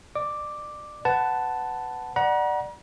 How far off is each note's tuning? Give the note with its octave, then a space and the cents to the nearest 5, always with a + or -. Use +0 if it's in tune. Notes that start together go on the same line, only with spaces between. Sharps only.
D5 +35 D6 +0
B4 +20 F#5 +10 A5 +0
D5 +20 F#5 +10 A#5 +40